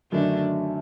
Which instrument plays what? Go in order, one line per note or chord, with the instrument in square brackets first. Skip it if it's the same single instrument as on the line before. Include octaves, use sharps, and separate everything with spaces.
[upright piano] F#2 D#3 F#3 A3 [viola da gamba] D3 D4